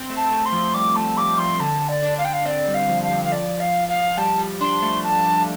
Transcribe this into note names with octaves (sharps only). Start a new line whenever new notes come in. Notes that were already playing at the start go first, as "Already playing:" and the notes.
Already playing: C4
A3
A5
A3
C6
F3
G3 D6
A3 A5
G3 D6
F3 C6
D3 A5
D5
D4
F5
G5
F5
C4 D5
G3
F5
F3
F5
F3
F5
D5
F5
F5
G3 A5
G3
D4 C6
A3
A5